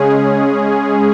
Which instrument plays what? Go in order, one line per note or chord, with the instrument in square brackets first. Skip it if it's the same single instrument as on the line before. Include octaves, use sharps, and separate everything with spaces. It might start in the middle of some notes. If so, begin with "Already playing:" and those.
Already playing: [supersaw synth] C#3 G#3 C#4 G#4